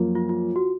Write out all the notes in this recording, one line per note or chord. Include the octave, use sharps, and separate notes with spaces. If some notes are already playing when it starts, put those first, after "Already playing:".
Already playing: F#2 F3 A#3 F4
F4
F4
F#4